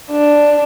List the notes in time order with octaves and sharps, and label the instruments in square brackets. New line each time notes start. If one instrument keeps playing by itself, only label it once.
[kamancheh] D4